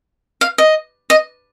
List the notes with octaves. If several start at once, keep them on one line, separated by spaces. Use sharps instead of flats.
F5
D#5
D#5